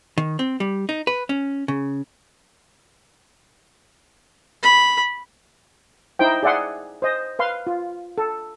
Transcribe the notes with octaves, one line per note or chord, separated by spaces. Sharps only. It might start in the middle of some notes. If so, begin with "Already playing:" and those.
D#3
C4
G3
D#4
B4
C#4
C#3
B5
D#4 E4 C5 G5
G#4 D5 E5 F#5 C6
C5 D#5
B4 F5 C6
F4
A4